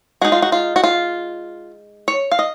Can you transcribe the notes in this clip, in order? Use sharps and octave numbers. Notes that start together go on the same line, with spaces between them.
G#3 D#4 F#4
F4
F#4
F4
F#4
F4
C#5
F5
D#5